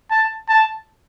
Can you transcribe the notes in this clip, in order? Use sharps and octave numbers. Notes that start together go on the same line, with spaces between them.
A5
A5